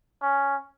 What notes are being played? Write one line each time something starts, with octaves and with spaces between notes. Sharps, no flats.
C#4